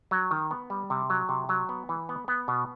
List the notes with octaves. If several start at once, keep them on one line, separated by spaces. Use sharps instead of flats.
F#3
D#3
B3
G3
C3
F#3
C3
F#3
B3
E3
B3
B3
B2